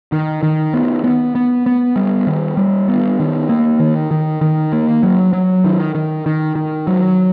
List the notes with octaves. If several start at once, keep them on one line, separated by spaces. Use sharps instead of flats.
D#3
D#3
B3
B3
B3
B3
G3
D#3
G3
B3
D#3
A#3
D#3
D#3
D#3
A#3
F#3
F#3
D#3
D#3
D#3
D#3
F#3